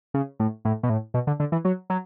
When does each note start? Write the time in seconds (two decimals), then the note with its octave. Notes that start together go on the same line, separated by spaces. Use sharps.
0.14 C#3
0.40 A2
0.65 A2
0.83 B2
0.90 A2
1.14 B2
1.27 D3
1.40 D3
1.52 E3
1.65 F#3
1.90 F#3